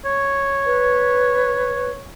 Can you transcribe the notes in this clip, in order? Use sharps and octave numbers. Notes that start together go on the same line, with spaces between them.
C#5
B4